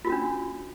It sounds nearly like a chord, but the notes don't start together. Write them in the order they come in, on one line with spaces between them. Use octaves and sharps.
F4 F#4 C#4 D4